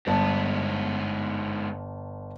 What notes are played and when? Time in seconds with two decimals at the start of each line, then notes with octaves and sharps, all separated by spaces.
0.07 G1 G#2 B3 A5